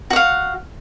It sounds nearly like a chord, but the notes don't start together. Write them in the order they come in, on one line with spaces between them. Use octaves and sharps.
F#4 F#5 F5